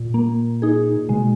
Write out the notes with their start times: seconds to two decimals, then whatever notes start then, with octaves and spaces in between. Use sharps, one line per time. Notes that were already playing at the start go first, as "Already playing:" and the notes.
Already playing: A#2
0.14 A#3
0.62 D#4 G#4
1.09 B2 G#3